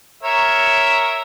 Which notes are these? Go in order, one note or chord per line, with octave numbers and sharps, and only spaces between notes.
A#4 C#5 E5